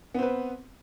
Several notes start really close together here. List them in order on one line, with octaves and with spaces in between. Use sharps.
B3 C4 B4